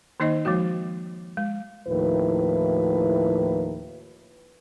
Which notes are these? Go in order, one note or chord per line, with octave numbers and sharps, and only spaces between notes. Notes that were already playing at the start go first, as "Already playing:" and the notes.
D#3 A#3 D#4 C5 D#5
F3 G#3 A#3 F#4
G#3
D#2 A2 F3 E4 B4